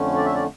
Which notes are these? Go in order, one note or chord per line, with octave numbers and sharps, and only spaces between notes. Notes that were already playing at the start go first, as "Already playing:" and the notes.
Already playing: F2 D3 A3 C#4
D5
E5
D5